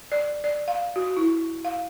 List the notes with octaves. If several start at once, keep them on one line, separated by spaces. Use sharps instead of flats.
D5
D5
F5
F#4
E4
F5